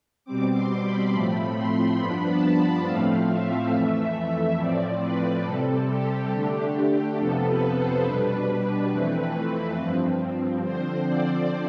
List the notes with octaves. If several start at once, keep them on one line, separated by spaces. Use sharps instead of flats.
B2 G3 C4 D6
C6
B5
A2 F3 A3 C4 B5
C6
G2 F3 B3 D4 B5
A5
A2 F3 A3 C4 F5
E5
F2 E3 A3
A2 F3 C4 D5
B4
C3 G3 C4 A4
G4
D3 A3 D4
F2 C3 F3 B3 A4
B4
C5
B2 G3 D4 B4
F2 E3 A3 C4
G2 F3 C4
D3 F3 C4 C5
D5